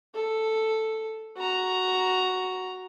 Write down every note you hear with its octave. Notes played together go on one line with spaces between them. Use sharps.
A4
F#4 A#5